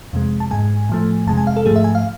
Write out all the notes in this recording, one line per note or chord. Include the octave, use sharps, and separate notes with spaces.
F2 C3 G#3
A5
G#2 G#3 G#5
A2 F3 A3
F2 C3 G#3 A5
G#5
F5
A4
G#2 F3 A3 G#4
E5
G#5
F5